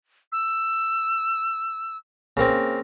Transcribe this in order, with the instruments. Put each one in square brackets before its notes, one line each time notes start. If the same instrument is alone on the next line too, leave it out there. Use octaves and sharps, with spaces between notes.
[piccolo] E6
[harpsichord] C#3 A#3 C4